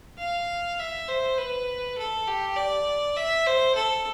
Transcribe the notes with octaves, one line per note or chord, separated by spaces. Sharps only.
F5
E5
C5
B4
A4
G4
D5
E5
C5
A4